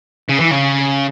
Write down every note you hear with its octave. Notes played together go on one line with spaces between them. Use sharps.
C#3
E3
C#3